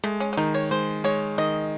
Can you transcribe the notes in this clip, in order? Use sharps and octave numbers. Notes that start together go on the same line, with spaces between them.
G#3 A3
C#4
C#4
D#3 D#4
C#5
G#3 C5
G#3 C#5
D#3 D#5